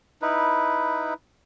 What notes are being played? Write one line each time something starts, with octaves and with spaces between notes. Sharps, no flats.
D#4 E4 B4